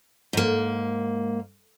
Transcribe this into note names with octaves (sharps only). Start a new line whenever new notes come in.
G#2 A#3